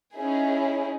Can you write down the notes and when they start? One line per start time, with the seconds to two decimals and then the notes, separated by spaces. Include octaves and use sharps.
0.17 C#4 D#4 E4 G#4